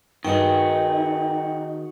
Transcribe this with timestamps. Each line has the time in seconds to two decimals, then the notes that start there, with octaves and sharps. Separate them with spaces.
0.25 G2 D#3 D#4 F#4 G#4 G5